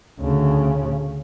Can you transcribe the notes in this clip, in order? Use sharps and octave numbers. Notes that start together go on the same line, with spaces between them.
D2 C#3